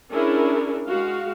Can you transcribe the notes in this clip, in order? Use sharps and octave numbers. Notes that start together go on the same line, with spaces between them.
C#4 D4 E4 G#4 A#4
G#3 F#4 F5